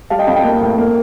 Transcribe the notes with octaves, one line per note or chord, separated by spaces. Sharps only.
G3 F5 A5
D#5 G5
F2 F5 A5
D#5 G5
A#3
A2
A#3